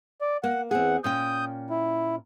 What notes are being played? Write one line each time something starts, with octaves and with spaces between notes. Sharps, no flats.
D5
A#3 F#5
E2 C4 G#4 F#5
A#2 C#4 G5 D#6 G6
E4